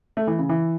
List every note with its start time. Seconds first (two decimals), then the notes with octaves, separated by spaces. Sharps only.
0.17 A3
0.27 E3
0.39 C#3
0.49 E3